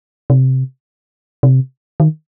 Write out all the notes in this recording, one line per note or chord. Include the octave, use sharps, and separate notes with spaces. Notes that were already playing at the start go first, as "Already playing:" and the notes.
C3
C3
D#3